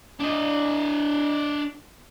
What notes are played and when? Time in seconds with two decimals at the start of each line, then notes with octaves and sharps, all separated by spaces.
0.20 D4 D#5